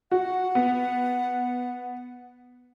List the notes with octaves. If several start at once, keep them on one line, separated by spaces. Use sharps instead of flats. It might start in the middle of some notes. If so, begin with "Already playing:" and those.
F#4 F#5
B3